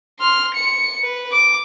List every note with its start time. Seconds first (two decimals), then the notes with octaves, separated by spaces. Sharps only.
0.19 C6 F6
0.54 C#7
1.03 B4
1.32 D6